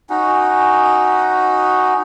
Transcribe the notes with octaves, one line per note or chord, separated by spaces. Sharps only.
C#4 D#4 F#4